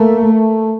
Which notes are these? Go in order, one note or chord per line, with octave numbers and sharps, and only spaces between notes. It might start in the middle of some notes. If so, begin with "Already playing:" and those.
Already playing: A3 A#3
A3